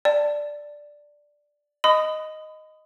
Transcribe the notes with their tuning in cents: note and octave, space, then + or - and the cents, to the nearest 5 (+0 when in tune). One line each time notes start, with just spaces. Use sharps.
D5 +0 A5 +15
D#5 +0 B5 +35 D#6 +0